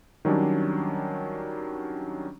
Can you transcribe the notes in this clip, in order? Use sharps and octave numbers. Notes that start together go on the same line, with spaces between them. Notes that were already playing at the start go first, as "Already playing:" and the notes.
D#3 F#3 G3 C#4 D4